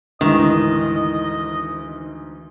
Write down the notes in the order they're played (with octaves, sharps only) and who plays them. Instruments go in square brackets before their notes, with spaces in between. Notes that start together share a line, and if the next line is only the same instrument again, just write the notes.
[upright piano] D2 G#2 E3 [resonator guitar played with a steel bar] D#3 [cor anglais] D#5